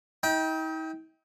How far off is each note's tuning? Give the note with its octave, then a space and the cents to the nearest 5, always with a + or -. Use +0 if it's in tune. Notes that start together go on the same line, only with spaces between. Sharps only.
D#4 +45 G5 +0